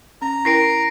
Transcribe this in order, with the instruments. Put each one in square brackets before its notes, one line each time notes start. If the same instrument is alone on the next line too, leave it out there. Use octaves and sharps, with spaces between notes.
[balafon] C#4 [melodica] A#5
[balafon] E4 A#4 G5 [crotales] A#6 C7 D7